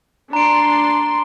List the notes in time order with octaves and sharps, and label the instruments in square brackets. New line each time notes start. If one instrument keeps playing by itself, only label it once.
[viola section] D4 C6 [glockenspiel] A#5 D7